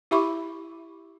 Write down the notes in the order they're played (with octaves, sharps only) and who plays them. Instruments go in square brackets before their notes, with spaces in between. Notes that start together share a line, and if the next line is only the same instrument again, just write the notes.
[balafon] E4 G4 E5 B5 C#6 D6